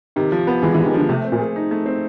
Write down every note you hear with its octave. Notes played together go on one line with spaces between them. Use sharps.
C3 D#3
F3
B3
E3 G#3
E3
C3
D#3
D3 F3
C3 A3
C4
A#2
G#4
D#4
A3
C4